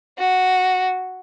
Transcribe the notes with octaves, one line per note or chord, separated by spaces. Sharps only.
F#4